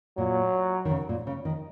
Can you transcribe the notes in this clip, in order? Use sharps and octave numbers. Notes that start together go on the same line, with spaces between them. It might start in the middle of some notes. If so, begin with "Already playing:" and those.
A#2 F#3
D#3
C#3
A#2
C#3
D#3